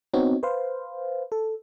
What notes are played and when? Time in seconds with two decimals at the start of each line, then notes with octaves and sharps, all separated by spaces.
0.13 B3 C4 D#4 F#4 C#5
0.43 B4 C5 F5
1.32 A4